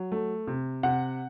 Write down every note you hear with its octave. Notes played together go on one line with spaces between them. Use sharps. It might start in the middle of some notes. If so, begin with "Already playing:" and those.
Already playing: F#3
A3
C3
C3 F#5